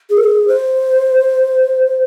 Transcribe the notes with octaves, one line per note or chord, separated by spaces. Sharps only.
G#4
A#4
G#4
C5